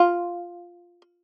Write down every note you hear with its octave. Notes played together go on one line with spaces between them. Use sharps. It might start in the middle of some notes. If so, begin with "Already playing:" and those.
Already playing: F4